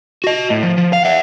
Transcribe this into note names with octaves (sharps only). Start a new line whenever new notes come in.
F#4 D#5
A2
F3
F3
F5
E5 F#5